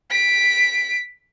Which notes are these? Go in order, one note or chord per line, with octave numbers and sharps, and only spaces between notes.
B6 D7